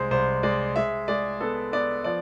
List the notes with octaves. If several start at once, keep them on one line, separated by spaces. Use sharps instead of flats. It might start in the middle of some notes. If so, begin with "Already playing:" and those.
Already playing: C2 G#3 C5
C2 C5
G#3 D5
G#3 E5
G#3 D5
B3 A4
B3 D5
F3 D5